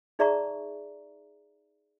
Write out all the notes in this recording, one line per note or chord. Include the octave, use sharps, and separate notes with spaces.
D#4 G#4 D5 E5 A#5 C#6